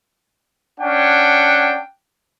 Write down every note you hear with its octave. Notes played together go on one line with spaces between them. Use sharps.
C#4 D4 F#5 G5